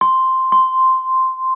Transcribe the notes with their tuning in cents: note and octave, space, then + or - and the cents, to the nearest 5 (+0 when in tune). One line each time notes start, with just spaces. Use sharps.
C6 +0
C6 -5